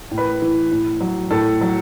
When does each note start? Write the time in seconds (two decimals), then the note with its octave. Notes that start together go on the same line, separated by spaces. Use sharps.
0.11 A2
0.18 B4
0.42 E3
0.71 A2
1.01 F#3
1.31 A2 A4
1.61 F#3